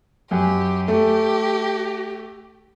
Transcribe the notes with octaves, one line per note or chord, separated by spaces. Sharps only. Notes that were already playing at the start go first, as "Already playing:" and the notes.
F#2 G4
A3 G4